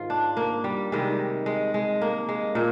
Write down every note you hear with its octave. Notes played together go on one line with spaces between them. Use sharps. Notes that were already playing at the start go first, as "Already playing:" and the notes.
Already playing: G#2 D#3 F4
D4
A#3
G3
C3 D#3 G3 G#3
G#3
G#3
A#3
G#3
A#2 A#3